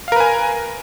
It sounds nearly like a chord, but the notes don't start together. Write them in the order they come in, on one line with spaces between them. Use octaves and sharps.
F5 A#4 B4 G#5